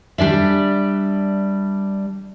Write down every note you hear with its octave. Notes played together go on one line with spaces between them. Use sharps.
G3 D4 D5 E5